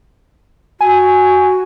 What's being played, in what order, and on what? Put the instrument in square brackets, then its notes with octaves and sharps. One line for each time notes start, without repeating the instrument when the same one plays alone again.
[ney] F#4 [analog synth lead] G#5